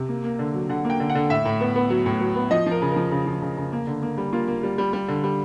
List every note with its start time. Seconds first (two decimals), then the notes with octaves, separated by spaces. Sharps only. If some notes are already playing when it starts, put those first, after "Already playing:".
Already playing: C3
0.09 A#3
0.24 A#3
0.39 D3
0.54 F#3
0.69 D3 F#5
0.85 A#3
0.90 G5
1.00 D3
1.10 F#5
1.15 D3
1.30 A2 E5
1.45 A2
1.61 B3
1.76 B3
1.90 F#3
2.06 A2
2.21 F#3
2.36 B3
2.51 F3 D#5
2.66 F3 A#4
2.82 C#3
2.92 F3 A#4
3.11 C#3
3.27 F3
3.42 C#3
3.57 C#3
3.72 A#3
3.87 D3
4.03 A#3
4.18 G3
4.33 A#3 F4
4.48 A#3
4.63 G3
4.78 G3
4.93 G3
5.08 D3
5.24 G3